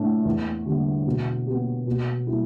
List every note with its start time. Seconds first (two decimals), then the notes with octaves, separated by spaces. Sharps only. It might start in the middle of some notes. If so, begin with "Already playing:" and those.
Already playing: A2 A3 D4
0.25 E2
0.66 D3 G3
1.07 B2
1.47 B3 G4
1.87 B2
2.27 G3 E4 G4